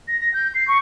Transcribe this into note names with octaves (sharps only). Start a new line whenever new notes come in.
A#6
A#6
G6
C7
C#6